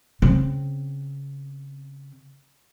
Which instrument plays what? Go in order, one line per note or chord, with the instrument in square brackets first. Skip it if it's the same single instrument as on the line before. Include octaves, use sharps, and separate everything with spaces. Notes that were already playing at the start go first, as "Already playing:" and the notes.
[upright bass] C#3 C4